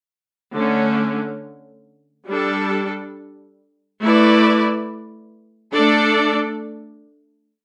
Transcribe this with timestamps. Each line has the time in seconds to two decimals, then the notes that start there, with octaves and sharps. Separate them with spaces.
0.54 D3 A3 C#4
2.27 G3 D4 A4
4.00 A3 E4 B4 D5
5.73 A3 D4 A4 D5